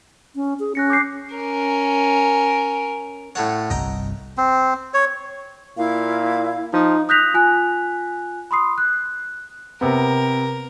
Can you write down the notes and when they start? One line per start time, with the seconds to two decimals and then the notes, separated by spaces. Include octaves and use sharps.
0.35 C#4
0.59 G#4
0.75 C#4 F#6 A#6 C#7
0.90 D6 G6 C7
1.35 C#4 A#4
3.35 A2 A4 C#5 F#5
3.70 G1 C2 G2 D#5 G5 A#5
4.38 C4
4.94 C#5
5.77 A#2 E4 F5
6.73 F3 D#4
7.09 D#6 F#6 G6 A#6 B6 F7
7.34 F4 G#5 F#6
8.51 B5 C6 D#6 C7
8.78 F#6
9.81 C3 B3 A#4